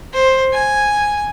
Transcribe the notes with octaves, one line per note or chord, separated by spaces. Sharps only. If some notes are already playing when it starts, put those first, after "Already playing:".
C5
G#5